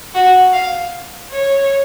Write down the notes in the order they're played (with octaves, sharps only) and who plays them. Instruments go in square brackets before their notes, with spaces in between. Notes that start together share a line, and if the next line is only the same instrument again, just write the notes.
[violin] F#4
F5
C#5